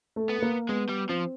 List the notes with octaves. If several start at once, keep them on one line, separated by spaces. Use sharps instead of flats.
A3
B3
A3
A#3
G#3 B3
G3
F3 C4